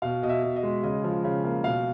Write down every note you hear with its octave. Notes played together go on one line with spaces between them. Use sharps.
B2 F5
B2 D#5
E5
B2
D#5
G#3
C#3 D#5
F3
C#3
A#3
B2 F5